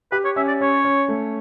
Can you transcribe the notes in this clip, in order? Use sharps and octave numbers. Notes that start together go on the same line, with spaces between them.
G4 B4
C#5
C#4 E5
D5
C#4 C#5
C#4
A3